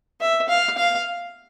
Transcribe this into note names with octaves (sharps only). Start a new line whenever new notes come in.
E5
F5
F5